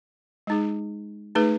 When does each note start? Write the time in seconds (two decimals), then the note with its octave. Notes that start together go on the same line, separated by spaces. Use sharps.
0.47 G#3 D#4 G#4
1.35 A3 D#4 G#4 B4